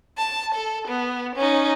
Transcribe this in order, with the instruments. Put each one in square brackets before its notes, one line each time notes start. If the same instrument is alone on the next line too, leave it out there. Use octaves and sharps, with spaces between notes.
[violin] A5
A4
B3
C#4 D#4